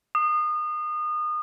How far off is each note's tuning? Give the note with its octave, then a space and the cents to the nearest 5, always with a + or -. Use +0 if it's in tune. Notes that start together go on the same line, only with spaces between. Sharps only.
D#6 -30